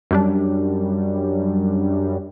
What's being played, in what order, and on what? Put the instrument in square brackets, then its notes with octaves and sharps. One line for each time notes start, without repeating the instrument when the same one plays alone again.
[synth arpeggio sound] F#2 G3 D4